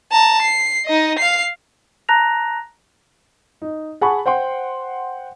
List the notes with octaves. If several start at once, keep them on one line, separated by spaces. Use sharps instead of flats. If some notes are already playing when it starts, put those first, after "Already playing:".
A5 A#5
C7
D#4 D#5
F5 C7
A5 A#5 F#6 A#6 F7
D#4
G#4 F#5 G#5 A5 B5 C#6
C5 F#5 G5 C6